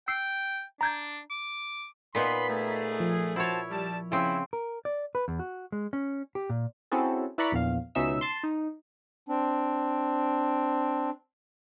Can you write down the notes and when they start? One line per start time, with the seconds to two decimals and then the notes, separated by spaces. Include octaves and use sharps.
0.08 G5 E6 C7
0.81 D4 A#5 G6 G#6
1.30 D6
2.15 A#2 B3 D#4 B5 C6 B6
2.49 A3 G#4
3.00 F3
3.36 E4 F#4 C5 C#5 A5
3.71 G3 A5
4.12 C#3 C4 E4
4.53 A#4
4.85 D5
5.15 B4
5.28 E2
5.39 F#4
5.72 G#3
5.93 C#4
6.35 G4
6.50 A#2
6.91 C4 C#4 E4 F#4 G#4 A4
7.38 E4 B4 D5 A#5 B5 C#6
7.52 A#1 E2 F5
7.95 C#2 B2 C#4 D#4 E5 E6
8.21 A5 C6
8.43 D#4
9.29 C4 D4